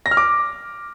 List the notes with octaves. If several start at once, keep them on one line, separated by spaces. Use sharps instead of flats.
A#6
F6
D6